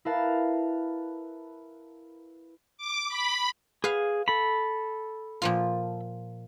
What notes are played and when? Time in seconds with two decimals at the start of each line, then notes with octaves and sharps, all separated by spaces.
0.05 E4 A#4 B4 F5 A5
2.78 D6
3.08 B5
3.84 G#4 B4 F5
4.28 A4 B5
5.42 A#2 F3 F4